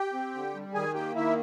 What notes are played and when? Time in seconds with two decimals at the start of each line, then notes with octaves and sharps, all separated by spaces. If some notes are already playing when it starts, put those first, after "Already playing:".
Already playing: G4 G5
0.13 C4
0.34 D3
0.55 G3
0.74 D#3 G#4 G#5
0.94 A#3 G4 G5
1.16 D#3 E4 E5